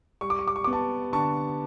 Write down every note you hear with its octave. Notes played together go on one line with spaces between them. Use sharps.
G3 C#6
D6
C#6
D6
C#6
B3 D6
A5 C#6
D3 A5 C#6